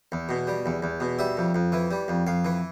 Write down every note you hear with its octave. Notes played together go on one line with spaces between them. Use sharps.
E2
B2
G3
E2
E2
B2
G3 E5
F2
F2
E3
G3
F2
F2 F5
E3